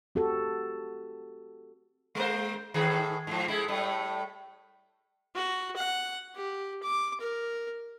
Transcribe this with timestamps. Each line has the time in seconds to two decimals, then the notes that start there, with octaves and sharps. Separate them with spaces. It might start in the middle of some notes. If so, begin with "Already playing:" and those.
0.15 C4 F#4 G4 A4
2.15 G#3 A#3 C5
2.74 A2 D#3 G#4
3.27 G#2 F3
3.48 G#3 A3 E4
3.68 A2 G3 A3
5.35 F#4
5.76 F#5
6.35 G4
6.83 D6
7.21 A#4